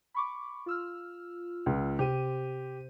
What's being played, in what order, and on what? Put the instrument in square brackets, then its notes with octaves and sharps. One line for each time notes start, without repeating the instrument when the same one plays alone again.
[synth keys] B5 C#6 D6
F4 E6 F6
[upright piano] C#2
[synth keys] C3 C5 D#7 [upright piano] G4